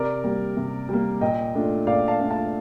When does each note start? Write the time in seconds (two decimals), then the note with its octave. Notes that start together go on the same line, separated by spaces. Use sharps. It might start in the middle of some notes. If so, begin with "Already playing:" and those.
Already playing: C3 A#4 D5
0.24 G3 A#3
0.57 C3
0.89 G3 A#3
1.21 A#2 D#5 G5
1.54 A3 D4 F4
1.87 A#2 D5 F5
2.08 F5 A5
2.19 A3 D4 F4
2.30 F5 A5